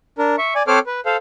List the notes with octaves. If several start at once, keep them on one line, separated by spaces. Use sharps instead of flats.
D4 A#4
E5 C#6
D5 G#5
C4 A4 C5 C#5 D6 F6
B4
A4 C5 F5